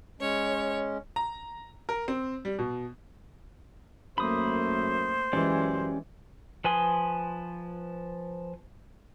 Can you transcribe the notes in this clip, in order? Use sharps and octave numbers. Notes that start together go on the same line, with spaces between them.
G#3 C#4 C#5
A#5
A#4
C4
G3
B2
F#2 A3 A#3 C5 B5 D#6
F#2 E3 G#3 C#4 G4 D5
F3 B4 G#5 C6 D#6